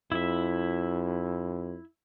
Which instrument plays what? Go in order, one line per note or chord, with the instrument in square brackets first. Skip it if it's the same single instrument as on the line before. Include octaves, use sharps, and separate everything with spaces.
[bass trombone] F2 [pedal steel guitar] E4 E5